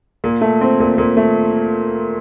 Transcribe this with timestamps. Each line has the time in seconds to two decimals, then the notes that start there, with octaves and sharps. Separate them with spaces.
0.24 A#2
0.41 A3
0.61 C4
0.80 A#2
0.98 A#2
1.17 A3